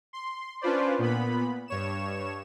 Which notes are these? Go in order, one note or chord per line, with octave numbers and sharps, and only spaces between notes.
C6
C#4 D4 F4 B4 C5 D5
A#2 B3 B5
G2 C#5 E7